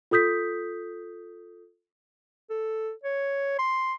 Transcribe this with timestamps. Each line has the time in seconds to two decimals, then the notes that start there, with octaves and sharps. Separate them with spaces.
0.11 F4 A4 D#6 G6 B6
2.50 A4
3.03 C#5
3.59 C6